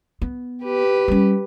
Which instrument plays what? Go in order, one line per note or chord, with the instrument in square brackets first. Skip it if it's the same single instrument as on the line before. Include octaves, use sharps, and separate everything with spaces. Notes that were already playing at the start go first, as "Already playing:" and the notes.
[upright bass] B3
[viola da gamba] G4 B4
[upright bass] G3 C#4